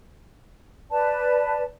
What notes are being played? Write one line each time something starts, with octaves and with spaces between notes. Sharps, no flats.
B4 D5 A5